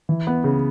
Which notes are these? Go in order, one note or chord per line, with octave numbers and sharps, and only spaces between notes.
E3
B3
C#3